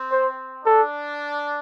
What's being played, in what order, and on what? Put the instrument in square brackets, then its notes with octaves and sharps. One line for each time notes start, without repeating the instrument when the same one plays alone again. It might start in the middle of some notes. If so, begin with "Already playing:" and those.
Already playing: [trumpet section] C4
[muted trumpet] C5
[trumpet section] D4 [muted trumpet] A4